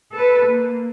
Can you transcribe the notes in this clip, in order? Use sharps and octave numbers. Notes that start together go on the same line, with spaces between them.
A4 B4
A#3